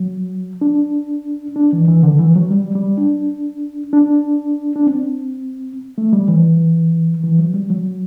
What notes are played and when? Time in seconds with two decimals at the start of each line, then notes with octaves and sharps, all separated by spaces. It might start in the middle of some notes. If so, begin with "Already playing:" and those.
Already playing: F#3
0.61 D4
1.56 D4
1.73 E3
1.88 E3
2.03 D3
2.19 E3
2.36 F#3
2.51 G3
2.75 G3
2.97 D4
3.93 D4
4.76 D4
4.87 C4
5.98 A3
6.13 G3
6.28 E3
7.24 E3
7.39 F#3
7.54 G3
7.70 F#3